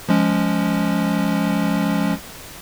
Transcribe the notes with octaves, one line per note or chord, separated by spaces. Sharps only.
F3 G#3 C#4